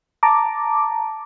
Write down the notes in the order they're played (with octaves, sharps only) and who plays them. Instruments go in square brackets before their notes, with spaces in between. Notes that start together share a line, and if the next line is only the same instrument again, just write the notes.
[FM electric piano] A5 A#5 D6